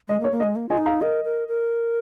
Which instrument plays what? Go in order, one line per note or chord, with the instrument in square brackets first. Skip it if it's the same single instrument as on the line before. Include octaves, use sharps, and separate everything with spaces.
[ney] G#3 [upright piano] D#5
[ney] A#3
[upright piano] C#5
[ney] A#3
[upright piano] D#5
[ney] G#3
A#3
[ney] F4 [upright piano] D#5 G#5
[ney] D#4
[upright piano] F5 A#5
[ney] A#4 [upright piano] D#5
[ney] A#4
A#4